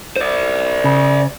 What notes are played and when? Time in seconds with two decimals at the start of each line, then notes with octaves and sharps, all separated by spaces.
0.16 C5 D5
0.84 C#3